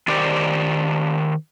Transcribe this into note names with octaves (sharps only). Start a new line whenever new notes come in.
D#3 G4 C5 D5